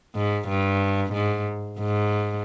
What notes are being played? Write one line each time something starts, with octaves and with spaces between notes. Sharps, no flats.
G#2
G2
G#2
G#2